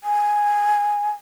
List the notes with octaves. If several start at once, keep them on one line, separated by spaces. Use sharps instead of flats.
G#5